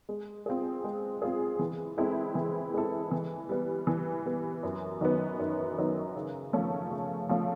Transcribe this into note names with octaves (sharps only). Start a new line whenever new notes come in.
G#3
C4 F4 G#4
G#3
C4 F4 G#4
E3
G#3 C4 E4 A4
E3
G#3 C4 E4 A4
E3
G3 B3
E3
G3 B3
F#2
D#3 F#3 B3
F#2
D#3 F#3 B3
C#3
F3 A3 C#4
C#3
F3 A3 C#4